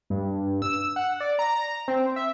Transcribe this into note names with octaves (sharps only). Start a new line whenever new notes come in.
G2
E6
F#5
D5
A#5
C4
E5